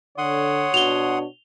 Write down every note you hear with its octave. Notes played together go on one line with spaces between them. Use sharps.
D3 C#5 F#5 C6 D#6
B2 D4 F#4 F7 G7